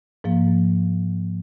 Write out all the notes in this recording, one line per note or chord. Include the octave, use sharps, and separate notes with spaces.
G#2 F3 A#3